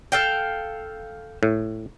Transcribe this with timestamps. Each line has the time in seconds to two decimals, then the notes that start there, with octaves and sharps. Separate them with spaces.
0.12 A4 F5 G5
1.43 A2